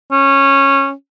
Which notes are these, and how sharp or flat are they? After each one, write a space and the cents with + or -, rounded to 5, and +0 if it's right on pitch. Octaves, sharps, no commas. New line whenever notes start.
C#4 -15